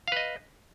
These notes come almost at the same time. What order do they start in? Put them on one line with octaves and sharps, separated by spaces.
F5 B4 D#5